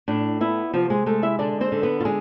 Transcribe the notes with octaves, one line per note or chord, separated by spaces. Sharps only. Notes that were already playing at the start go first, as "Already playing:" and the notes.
A2 D4
B3 E4
C3 F3 F4
G#3 G#4
G#3 A3 A4
E4 E5
D3 D4 D5
C4 C5
D3
B3 B4
F4
G#3 G#4